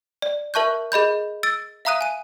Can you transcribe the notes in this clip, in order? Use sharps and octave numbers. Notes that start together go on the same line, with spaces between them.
D5
A#4 E5 A5 C#6 F#6 G6
G#4 D#5 B5 G6
E6 A6 D7
E5 F5 A#5 D#6 F#6 D#7
G#5 D#7